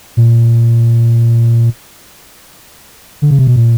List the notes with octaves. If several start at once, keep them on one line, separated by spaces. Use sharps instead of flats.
A#2
D3
C#3
C3
B2
A#2